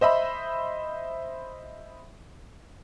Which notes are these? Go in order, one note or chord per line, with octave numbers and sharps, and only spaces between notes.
C5 D#5 E5 B5